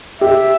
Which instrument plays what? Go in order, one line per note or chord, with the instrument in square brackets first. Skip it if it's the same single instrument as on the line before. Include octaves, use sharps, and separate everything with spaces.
[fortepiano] G4 [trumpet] E5